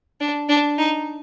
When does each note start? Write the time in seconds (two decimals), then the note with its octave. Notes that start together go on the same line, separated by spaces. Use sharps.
0.20 D4
0.49 D4
0.78 D#4